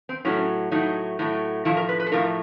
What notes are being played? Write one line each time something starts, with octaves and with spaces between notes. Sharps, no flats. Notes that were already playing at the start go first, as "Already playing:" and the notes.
C4
A2 F#3 A3 C#4
A2 F#3 A3 D#4
A2 F#3 A3
A2 F3 A3 E4
A#4
B4
B4
A4
A2 F3 A3 A#4